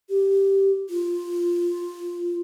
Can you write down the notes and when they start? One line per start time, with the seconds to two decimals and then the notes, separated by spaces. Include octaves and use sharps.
0.10 G4
0.90 F4